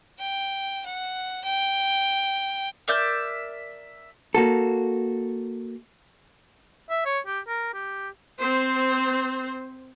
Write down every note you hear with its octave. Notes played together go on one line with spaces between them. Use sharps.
G5
F#5
G5
A#4 D5 E5 G6
A#3 F#4 A4
E5
C#5
G4
A#4
G4
C4 C5